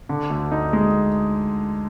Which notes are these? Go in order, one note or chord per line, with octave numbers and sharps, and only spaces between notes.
D3
D2
D#4
G#3